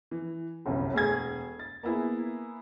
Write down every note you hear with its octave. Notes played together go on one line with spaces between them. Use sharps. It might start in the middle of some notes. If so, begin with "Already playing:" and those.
E3
G1 C2 F#2
E1 A3 G#4 G#6
A6
A#3 B3 E4 G#4